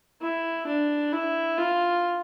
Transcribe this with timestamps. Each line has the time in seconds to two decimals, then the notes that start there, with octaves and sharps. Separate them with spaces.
0.22 E4
0.67 D4
1.13 E4
1.58 F4